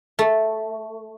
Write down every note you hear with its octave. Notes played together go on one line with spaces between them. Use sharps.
A3